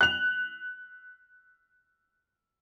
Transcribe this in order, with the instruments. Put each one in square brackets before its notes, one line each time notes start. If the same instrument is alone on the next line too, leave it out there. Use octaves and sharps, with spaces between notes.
[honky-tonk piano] F#6 F7